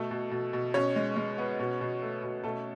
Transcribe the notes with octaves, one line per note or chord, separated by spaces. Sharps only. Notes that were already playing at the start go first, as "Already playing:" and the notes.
Already playing: B2 A3 A4
B2
B2
B2
B2 C#4 C#5
G#3
G#3
B3
B2
B2
A3
B2
B2 A3 A4